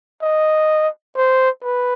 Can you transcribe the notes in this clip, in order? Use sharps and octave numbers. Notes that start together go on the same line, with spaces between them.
D#5
C5
B4